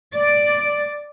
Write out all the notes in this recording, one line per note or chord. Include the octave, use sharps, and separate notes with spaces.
D5